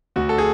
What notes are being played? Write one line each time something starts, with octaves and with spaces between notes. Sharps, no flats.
D2 F#4
A4
G#4